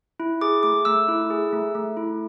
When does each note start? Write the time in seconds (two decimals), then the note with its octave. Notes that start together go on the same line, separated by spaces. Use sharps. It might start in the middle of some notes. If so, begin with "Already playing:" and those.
0.20 E4
0.41 G#4 D6
0.63 A3 D6
0.85 A3 E6
1.08 E4
1.30 G#4
1.53 A3
1.75 A3
1.97 E4